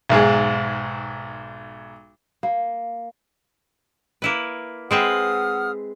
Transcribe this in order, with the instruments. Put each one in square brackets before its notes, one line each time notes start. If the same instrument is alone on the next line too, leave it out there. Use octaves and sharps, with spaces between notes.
[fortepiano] B1 G#2 G#3
[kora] A#3
[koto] A#3 E4 B4
[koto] G#3 C4 B4 [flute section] F#5 D#6 F6